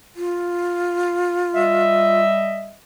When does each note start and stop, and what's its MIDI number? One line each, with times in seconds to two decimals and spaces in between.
0.16 2.22 65
1.55 2.74 55
1.55 2.74 75
1.55 2.74 76